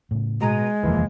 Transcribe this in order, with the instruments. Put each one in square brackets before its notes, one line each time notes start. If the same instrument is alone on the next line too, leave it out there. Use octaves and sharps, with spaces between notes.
[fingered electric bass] A2 C#3
[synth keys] B2 A#5 D#7 [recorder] G#3
[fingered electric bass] F1 D#2 [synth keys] E3 F3 A#3